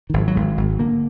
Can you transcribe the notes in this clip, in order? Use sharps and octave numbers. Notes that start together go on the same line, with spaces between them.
D#3
G#1 F3
F#3
G#1 G#3
G#1
D3 A#3